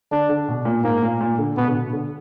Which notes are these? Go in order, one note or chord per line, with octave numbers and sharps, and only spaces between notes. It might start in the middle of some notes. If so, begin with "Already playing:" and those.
D3 D4
D3
B2
A#2
G#2 A#3
A#2
A#2
D3
B2 B3
D3
B2
D3